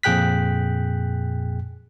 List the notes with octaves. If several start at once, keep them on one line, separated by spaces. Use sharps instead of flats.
F2 A#2 G#4 G5 F#6 B6